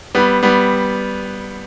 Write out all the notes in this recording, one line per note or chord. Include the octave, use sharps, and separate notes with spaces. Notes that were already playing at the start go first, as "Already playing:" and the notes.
G3 B3
G3 B3